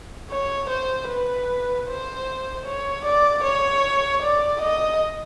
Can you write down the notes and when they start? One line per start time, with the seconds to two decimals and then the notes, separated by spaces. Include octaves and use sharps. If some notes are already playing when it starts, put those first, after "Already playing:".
0.31 C#5
0.70 C5
1.09 B4
1.88 C5
2.66 C#5
3.05 D5
3.44 C#5
4.23 D5
4.62 D#5